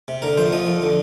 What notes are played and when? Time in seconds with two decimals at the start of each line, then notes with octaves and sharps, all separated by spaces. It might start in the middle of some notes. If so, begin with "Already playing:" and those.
0.08 C3
0.22 D3 A#4
0.37 F2 C5
0.52 F3 D#5
0.67 F2
0.82 D3